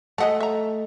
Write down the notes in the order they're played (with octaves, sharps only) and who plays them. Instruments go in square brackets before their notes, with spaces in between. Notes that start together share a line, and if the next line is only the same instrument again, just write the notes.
[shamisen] G#3 F#5 A5 [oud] A3 D#5
[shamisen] E5 A#5